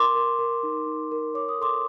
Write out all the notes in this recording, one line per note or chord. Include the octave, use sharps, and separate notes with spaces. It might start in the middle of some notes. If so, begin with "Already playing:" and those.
Already playing: A#4 C6 D6
A#4
A#4
D#4
D#4
A#4
C#5 D6
D#6
A4 C6 D6